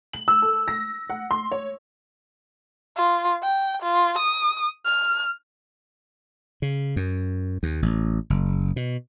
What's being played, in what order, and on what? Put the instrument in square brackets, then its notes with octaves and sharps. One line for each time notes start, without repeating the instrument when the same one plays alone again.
[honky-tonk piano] F#7
E6
A4
A#6
F#5
C6
C#5
[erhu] F4
G5
F4
D#6
F6
[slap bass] C#3
F#2
D#2
A1
F#1
B2